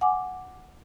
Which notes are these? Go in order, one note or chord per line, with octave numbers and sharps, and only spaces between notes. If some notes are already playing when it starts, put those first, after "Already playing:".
F#5 G#5 D6